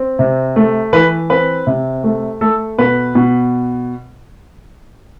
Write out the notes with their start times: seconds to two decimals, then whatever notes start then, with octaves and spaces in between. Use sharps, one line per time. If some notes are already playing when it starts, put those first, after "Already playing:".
Already playing: C4
0.19 C3
0.56 A3
0.93 E3 B4
1.30 C4 B4
1.67 C3
2.04 A3
2.41 A3 A4
2.78 B2 B4
3.15 B2